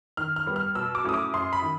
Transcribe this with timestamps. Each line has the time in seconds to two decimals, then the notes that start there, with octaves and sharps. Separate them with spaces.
0.17 D#3 F6
0.36 F6
0.46 G3 B3
0.56 F6
0.75 B2 E6
0.95 D6
1.04 F#3 A3 C#4 E4 D#6
1.14 D6
1.33 F#2 C6
1.53 B5
1.62 D#3